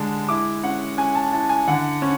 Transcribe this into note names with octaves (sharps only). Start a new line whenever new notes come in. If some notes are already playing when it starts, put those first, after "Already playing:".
Already playing: D3 G#3 D4
E4 D6
C#4 F#5
C#4 G#5
A5
E4 A5
G#5
D3 F#5
C#4